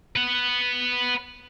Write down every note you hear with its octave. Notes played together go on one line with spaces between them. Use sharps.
B4 F#5